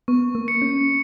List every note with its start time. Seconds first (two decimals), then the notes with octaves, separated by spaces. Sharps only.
0.08 B3 C#6
0.35 A#3
0.48 C#7
0.62 C#4